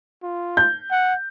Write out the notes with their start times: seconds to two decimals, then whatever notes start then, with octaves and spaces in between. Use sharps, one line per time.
0.23 F4
0.57 G6
0.91 F#5